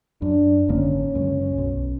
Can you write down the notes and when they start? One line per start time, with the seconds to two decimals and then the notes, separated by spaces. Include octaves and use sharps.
0.22 F#2 D4
0.69 G#1 D3 A#3 C#4
1.15 C#2 F#2
1.58 B1